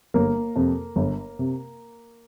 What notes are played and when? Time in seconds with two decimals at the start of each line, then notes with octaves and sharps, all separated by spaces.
0.14 G1 A#3 A#4
0.56 F2 C3
0.96 G1
1.39 C3